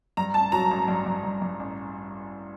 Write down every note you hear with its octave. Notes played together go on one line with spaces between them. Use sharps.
G2 A#5
A1 A5
F#3 A#5
A1
G2
G2
G2
G2
A1